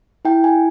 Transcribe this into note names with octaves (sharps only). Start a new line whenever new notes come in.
E4 G5
G#5